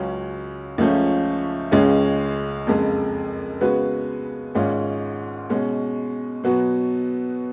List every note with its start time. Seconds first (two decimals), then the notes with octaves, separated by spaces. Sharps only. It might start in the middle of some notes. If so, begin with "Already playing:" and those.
Already playing: C#2 C#3 F#3 C#4
0.78 C#2 C#3 F3 A3 C#4
1.71 C#2 C#3 G#3 C#4
2.66 F#1 F2 C#3 G#3
3.61 C#3 G#3 B3 F#4 B4
4.55 G#1 G#2 G#3 C#4 F4
5.50 B2 G#3 C#4
6.44 B2 F#3 B3 F#4